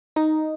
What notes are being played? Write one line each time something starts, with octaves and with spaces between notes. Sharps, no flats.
D#4